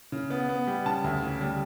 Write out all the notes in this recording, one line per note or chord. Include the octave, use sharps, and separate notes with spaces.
C#3
B3
B3
G3
C#3 A5
D2
C#3
G3